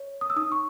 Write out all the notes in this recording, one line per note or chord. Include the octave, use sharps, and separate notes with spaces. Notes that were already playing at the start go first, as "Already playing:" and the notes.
Already playing: C#5
D#6
E6
D#4 D#6
C#6